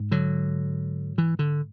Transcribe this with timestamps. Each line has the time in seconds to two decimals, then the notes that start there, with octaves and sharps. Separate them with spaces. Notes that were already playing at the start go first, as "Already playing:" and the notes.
Already playing: G#2
0.11 D3 F#3
1.18 E3
1.39 D3